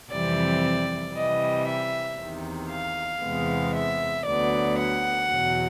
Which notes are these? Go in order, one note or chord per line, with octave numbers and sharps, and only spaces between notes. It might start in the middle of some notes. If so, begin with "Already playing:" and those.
F2 C3 E3 G3 C4 D5
C3 E3 G3 D#5
E5
E2 C3 D#3
F5
E2 C3 E3 G#3 B3
E5
D2 D3 F#3 B3 D5
F#5
E2 B2 F#3